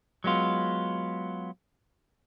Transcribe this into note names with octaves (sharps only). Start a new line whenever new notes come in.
F#3 G#3 B3 F4